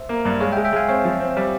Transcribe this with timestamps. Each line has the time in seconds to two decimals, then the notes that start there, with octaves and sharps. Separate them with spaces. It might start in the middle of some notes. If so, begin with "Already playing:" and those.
Already playing: C5 E5
0.09 A#3
0.25 G2
0.40 G#3 C#5 F5
0.52 E5 G5
0.57 G#3
0.65 E5 G5
0.72 G#3 F5 G#5
0.89 C4 C#5 F5
1.05 F3
1.20 C4
1.37 G3